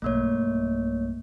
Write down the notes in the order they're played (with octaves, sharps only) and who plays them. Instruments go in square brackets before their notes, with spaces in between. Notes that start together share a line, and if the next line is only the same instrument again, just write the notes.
[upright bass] B1 G2 [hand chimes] A3 A#3 C#5